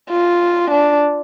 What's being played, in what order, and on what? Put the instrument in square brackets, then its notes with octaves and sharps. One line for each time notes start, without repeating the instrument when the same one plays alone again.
[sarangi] F4
D4